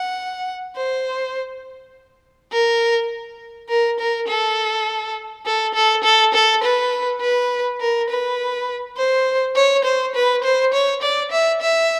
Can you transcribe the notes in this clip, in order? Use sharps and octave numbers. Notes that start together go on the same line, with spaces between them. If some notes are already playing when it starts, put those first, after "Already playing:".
Already playing: F#5
C5
A#4
A#4
A#4
A4
A4
A4
A4
A4
B4
B4
A#4
B4
C5
C#5
C5
B4
C5
C#5
D5
E5
E5